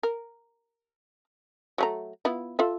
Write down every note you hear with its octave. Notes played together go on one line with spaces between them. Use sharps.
A#4
F#3 A3 A#5
B3 E4 F4
F4 A4 E5